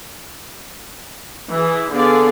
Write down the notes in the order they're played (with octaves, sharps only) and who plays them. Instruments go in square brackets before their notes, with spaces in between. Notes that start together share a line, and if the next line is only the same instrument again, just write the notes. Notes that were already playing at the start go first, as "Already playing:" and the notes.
[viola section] E3 G#4
D3 B3 G#4 A4 D5 F5